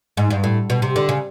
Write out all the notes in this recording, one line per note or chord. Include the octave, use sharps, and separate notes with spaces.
G#2
G2
A2
B2
C3
D3
C#3